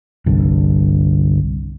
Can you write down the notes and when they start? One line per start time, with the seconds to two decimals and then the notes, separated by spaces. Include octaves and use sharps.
0.26 G1 C2 G2